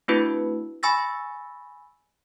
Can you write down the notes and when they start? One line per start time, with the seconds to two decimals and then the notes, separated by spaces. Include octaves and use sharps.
0.08 A3 C4 D4 E4 F#4 B4
0.83 G#5 B5 C#6 E6 A6 A#6